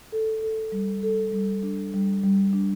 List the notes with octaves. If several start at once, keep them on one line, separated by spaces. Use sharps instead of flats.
A4
A4
G3
A4
G3
D4
G3
G3
D4